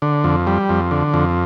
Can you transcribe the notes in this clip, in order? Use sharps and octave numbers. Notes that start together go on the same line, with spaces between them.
D3
F2
G3
F2
D3
F2